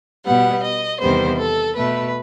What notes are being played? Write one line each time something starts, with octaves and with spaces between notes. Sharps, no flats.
B2 G3 B3 F#5
D#5
E2 C3 D#3 G3 B3 C5
A4
B2 A3 B4